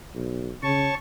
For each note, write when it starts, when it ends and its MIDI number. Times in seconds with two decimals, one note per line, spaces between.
0.15 0.52 35
0.63 0.90 49
0.63 0.94 73
0.63 0.94 81
0.63 0.94 85